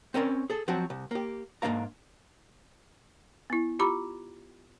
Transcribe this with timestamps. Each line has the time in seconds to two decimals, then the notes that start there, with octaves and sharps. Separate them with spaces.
0.14 C4 C#4 A#4 D5
0.50 G#4 A4
0.68 F3 F#3 C4 F#4
0.90 C2
1.11 A#3 G4
1.62 G#2 A#3 D4 F5 A#5
3.50 B3 E4
3.79 F4 G4 A#5 B5 D6